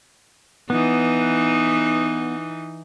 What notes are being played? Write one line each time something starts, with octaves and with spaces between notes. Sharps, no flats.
E3 B3 D#4